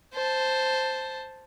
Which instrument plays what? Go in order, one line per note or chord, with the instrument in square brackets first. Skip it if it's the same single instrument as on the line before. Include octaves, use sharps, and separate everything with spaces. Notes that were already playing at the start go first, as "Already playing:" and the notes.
[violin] C5 A5